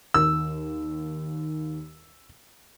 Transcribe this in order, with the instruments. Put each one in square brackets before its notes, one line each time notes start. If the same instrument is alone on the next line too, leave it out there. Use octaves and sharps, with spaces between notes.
[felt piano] D#2 [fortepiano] E6